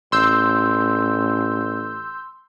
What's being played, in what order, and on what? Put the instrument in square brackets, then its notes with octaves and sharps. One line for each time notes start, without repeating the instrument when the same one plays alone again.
[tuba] A1 [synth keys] C6 E6 G6